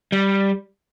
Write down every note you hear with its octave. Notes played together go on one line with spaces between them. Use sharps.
G3